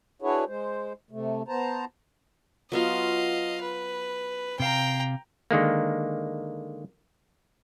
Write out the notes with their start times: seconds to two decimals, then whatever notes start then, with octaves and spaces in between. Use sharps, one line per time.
0.22 D4 E4 F#4 G#4 B4 C#5
0.47 G#3 C5
1.11 C3 A3
1.48 B3 C5 A5 A#5
2.72 F#3 B3 F4 D#5 F5
3.61 B4
4.60 C3 F5 G5 A#5
5.51 D3 D#3 G#3 A#3